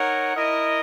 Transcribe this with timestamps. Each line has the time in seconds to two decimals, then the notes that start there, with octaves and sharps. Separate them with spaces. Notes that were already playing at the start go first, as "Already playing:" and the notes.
Already playing: D#4 A#4 C#5 F#5
0.35 E4 A#4 D#5